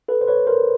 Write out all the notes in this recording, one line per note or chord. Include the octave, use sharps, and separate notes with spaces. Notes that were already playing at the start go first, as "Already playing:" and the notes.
A4 B4
C5
B4 C#5
A#4 C5